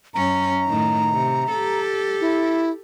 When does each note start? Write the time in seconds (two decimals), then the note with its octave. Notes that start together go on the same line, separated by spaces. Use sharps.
0.14 F#2 C#4 A#5
0.67 A2 D#3
1.13 C3
1.51 G4 A4
2.21 E4